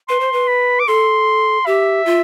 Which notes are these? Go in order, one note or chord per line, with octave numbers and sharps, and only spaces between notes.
B4 C6
C5
B4
B5
D6
A4 C6
G4 E5
F4